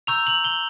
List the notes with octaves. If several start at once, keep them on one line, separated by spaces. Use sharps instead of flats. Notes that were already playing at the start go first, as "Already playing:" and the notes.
A#5 C#6 E6 G6 F7
F#7
G7